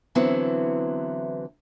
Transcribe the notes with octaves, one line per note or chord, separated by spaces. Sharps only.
D3 E3 F#3 B3 C4 E4